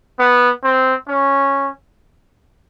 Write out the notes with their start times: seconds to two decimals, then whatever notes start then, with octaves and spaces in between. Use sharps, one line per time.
0.19 B3
0.63 C4
1.07 C#4